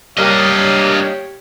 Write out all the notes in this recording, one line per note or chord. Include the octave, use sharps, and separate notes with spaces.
G3 A#3 D4 G4 C#5 D#5 F5